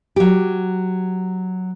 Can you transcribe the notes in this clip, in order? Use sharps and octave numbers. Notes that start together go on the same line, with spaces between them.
F#3 G4